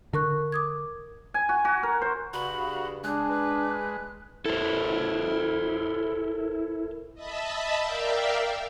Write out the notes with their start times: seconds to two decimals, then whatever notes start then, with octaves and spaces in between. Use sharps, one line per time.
0.13 D3 A#4 C#6 F#6
0.52 D6 D#6 G#6
1.34 G#5
1.49 F#4
1.65 F#4
1.83 A#4
2.02 C5
2.33 G2 C#3 F#4 B5
3.04 G#3 D4 F#6
3.30 B4
4.46 E4 A4 A#4 C5
7.15 D#5 E5 A5 B5
7.79 A#4 D5 E5 F5 G5